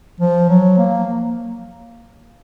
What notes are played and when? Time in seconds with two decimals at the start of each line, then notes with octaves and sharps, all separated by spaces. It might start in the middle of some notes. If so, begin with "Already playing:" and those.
0.20 F3
0.49 F#3
0.78 A#3